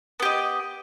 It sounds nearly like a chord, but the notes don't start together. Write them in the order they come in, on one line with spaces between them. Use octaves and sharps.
B3 G4 D#5